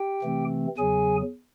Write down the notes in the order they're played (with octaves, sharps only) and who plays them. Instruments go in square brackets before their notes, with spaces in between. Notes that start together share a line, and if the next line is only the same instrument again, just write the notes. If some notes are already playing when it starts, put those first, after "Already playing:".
Already playing: [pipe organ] G4 G5
C3 E3 A3 C4
E2 C#3 F#3 G#4 G#5